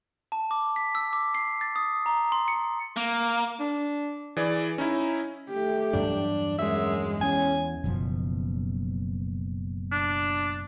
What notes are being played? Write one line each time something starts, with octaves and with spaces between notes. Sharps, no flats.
A5
D6
B6
E6
D6
C7
A6
D#6
A#5
C6
C#7
A#3
D4
E3 G#4 D5
C#4 D#4 E4
A3 G4
E2 G2 F#3 D4
F#2 G#3 E5
E2 C#4 G#5
F#1 B2 F3
D4